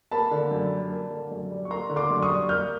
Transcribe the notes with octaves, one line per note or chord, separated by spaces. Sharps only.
A#3 A5 B5
D3
F#2
G3
A#3
D3
F#2
G3
C#6
A#3 A#5 C6
D3
C6 D6
F#2
C#6 D#6
G3
A#3 F6 G6